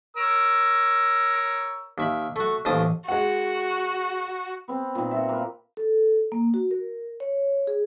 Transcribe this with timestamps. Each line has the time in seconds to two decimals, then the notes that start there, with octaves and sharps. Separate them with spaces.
0.17 A#4 C#5 E6
1.98 D#2 E5 B5
2.36 A3 F#4
2.65 A1 D#2 C5 A5 D#6
3.08 G#3 F#4 F#5
4.68 B3 C4
4.95 A#2 D#3
5.11 F4 F#4 E5
5.29 A#3 B4
5.77 A4
6.32 A#3
6.54 F#4
6.71 A#4
7.20 C#5
7.67 G#4